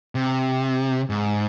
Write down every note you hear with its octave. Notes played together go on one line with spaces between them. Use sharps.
C3
G#2